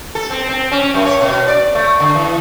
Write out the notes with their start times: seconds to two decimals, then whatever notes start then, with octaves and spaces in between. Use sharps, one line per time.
0.15 A4
0.30 C4
0.49 C4
0.72 C#4
0.94 F#2
1.06 C#5
1.21 B2
1.48 D5
1.75 A3
2.00 D3
2.15 E3